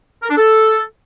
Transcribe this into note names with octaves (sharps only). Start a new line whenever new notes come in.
A#4
D4
A4